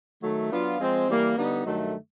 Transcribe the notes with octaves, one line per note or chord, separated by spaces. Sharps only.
D#3 F#3 A3
F#3 B3 D4 F4
F3 G#3 C4
E3 G3 A#3
D3 G3 B3 D#4
G2 D#3 F#3 A3